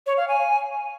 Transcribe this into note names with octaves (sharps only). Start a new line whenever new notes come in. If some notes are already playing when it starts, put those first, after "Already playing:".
C#5
F5
G#5